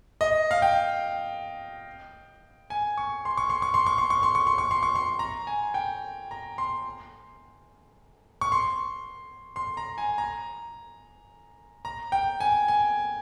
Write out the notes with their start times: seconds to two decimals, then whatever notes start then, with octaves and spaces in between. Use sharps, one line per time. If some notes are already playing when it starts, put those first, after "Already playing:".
0.21 D#5
0.51 F5
0.62 G5
2.70 G#5
2.98 C#6
3.25 C6
3.37 C#6
3.50 C6
3.62 C#6
3.74 C6
3.86 C#6
3.98 C6
4.10 C#6
4.23 C6
4.35 C#6
4.47 C6
4.58 C#6
4.71 C6
4.83 C#6
4.95 C6
5.19 A#5
5.47 G#5
5.74 G5
6.31 A#5
6.58 C6
8.41 C#6
8.52 C6
9.56 C6
9.77 A#5
9.98 G#5
10.18 A#5
11.85 A#5
12.12 G5
12.40 G#5
12.68 G#5